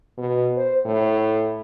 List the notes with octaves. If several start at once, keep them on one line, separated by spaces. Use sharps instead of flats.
B2
C5
A2